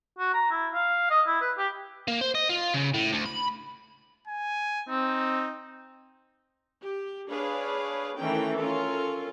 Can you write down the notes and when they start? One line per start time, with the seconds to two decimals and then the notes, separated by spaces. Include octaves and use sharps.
0.19 F#4
0.33 A#5
0.51 E4
0.74 F5
1.10 D#5
1.27 E4
1.41 B4
1.57 G4
2.08 A#3
2.21 C5
2.35 D#5
2.49 F4
2.74 C#3
2.94 A2
3.13 D2
3.26 B5
4.28 G#5
4.89 C4 D#4
6.82 G4
7.29 D4 G#4 B4 C#5 F5
8.17 D#3 E3 A3 C#4 A#4 G5
8.56 C#4 F4 A4 A#4